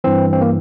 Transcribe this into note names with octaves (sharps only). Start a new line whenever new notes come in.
G2 E3 C4
C4
A#3